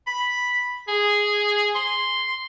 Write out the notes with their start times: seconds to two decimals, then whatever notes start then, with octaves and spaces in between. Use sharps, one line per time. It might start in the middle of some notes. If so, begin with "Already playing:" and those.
0.07 B5
0.88 G#4
1.75 C6